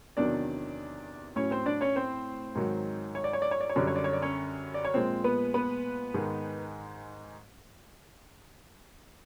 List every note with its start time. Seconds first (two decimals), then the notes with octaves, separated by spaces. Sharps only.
0.17 E2 C3 D#3 F#3 D4 D5
1.36 A2 F#3 C#4 C#5
1.51 C4 C5
1.66 D4 D5
1.81 C#4 C#5
1.96 C4 C5
2.55 G#2 D#3 F#3
3.15 C#5
3.24 D5
3.33 C#5
3.42 D5
3.51 C#5
3.61 D5
3.70 C#5
3.76 F#2 D3 G3 D5
3.87 C#5
3.96 D5
4.04 C#5
4.13 D5
4.22 C#4 C#5
4.74 D5
4.85 C#5
4.94 A#2 F3 G#3 C4 C5
5.24 B3 B4
5.54 B3 B4
6.14 G#2 D#3 G#3